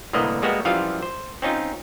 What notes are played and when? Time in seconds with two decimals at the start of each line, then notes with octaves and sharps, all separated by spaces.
0.13 C2 A2 D3 A#3 B3 D#5
0.42 G3 G#3 A#3 B3 F#4
0.65 F#2 E3 F3 G3 F4 F5
1.03 C5
1.42 C4 C#4 D#4 F4